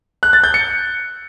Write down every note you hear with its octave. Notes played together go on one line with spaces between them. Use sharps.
F#6
A6
G6
C#7